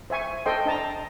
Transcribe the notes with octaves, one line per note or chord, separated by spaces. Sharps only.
C5 E5 G#5 C#6
A4 C5 D#5 G5 C6
D4 D#5 A5 A#5